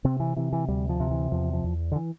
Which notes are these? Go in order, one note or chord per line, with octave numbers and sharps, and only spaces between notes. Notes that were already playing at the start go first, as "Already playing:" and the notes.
C3 C4
E3
C3 E3
E3
D2 G3
F3
C3
E3
E2 F3
F3
E2
D3
E3